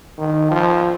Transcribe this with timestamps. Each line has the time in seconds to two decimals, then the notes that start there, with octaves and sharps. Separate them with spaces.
0.18 D#3
0.51 F3